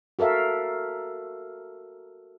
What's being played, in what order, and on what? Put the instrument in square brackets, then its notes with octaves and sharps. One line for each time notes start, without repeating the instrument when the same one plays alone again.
[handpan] F#4 A4 A#4 E5 F5